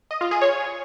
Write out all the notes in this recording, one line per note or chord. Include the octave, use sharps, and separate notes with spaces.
D#5
F4
G#4
C#5